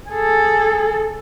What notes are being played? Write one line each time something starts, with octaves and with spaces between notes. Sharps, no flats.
G#4 A4